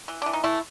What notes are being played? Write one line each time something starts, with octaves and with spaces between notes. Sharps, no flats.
E3
E3 D4
D#4
A3 E4